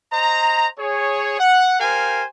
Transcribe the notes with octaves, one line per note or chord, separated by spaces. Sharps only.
C5 D#5 A#5
G#4 C#5
F#5
G4 A#4 C5 F5 G#5